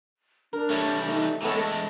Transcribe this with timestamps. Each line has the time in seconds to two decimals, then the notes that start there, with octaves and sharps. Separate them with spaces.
0.53 D4 A#4
0.70 E3 G3 A3 C#5
1.08 A3 D#4
1.42 E3 G#3 A3 B3 C#4 A4
1.58 A3 A5